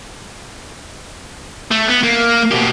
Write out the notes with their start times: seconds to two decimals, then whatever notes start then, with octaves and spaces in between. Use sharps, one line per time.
1.71 A3
1.88 B3
2.03 A#3
2.51 B2 G4